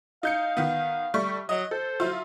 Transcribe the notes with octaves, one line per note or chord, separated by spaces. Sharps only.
D#4 F5 G6 C#7
D#3 B3
G3 A3 C#6
F#3 D#5
A4 C5
F#3 E4 F4